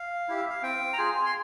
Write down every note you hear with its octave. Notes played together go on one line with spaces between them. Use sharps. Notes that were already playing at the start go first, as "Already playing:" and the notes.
Already playing: F5
E4 G4
E5
F5
C4 G5
A#5
F4 G#4 G#5
C6